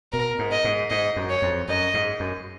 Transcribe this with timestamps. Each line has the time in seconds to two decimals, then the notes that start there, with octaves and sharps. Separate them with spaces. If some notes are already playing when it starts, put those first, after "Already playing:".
0.13 B2 A#4
0.39 G#2
0.51 D#5
0.64 G#2
0.90 G#2 D#5
1.16 F#2
1.30 C#5
1.42 F2
1.68 F#2 D#5
1.94 G#2
2.20 F#2